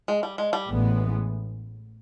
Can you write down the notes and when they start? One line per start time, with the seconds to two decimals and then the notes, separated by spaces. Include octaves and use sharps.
0.08 G#3
0.23 G3
0.38 G#3
0.53 G3
0.68 A1 A2 E3 G#3 B3